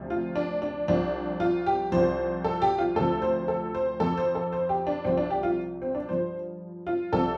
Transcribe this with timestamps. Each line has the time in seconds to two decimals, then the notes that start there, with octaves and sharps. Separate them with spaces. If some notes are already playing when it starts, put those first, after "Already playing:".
Already playing: D2 C3 F3
0.10 F4
0.36 D4
0.62 D4
0.88 C2 C3 F3 D4
1.40 F4
1.66 G4
1.92 C2 C3 F3 C5
2.44 A4
2.62 G4
2.78 F4
2.95 D2 C3 F3 A4
3.22 C5
3.48 A4
3.75 C5
4.00 F2 F3 A4
4.18 C5
4.35 A4
4.53 C5
4.69 G4
4.87 D4
5.04 C2 C3 F3 C4
5.17 D4
5.30 G4
5.43 F4
5.82 C4
5.95 D4
6.09 G2 F3 C5
6.87 F4
7.12 C2 C3 F3 A4